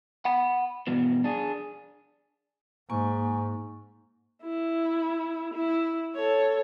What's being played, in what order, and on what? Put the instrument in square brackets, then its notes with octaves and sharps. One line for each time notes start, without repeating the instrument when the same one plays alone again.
[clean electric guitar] F#5 B5
G2 B2 E3
D4 G#4
[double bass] G#2 [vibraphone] A#3 G#5 C#6
[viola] E4
E4
A4 C#5